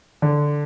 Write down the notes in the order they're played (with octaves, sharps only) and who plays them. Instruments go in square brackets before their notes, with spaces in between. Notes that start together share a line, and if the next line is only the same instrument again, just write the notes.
[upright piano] D3